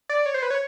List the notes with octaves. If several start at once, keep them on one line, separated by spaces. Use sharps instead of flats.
D5
C#5
C5
B4
C#5